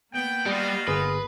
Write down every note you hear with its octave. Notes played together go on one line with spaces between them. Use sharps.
A#3 B3 G5
G3 D#4 F4 F#4
G1 G#4 B4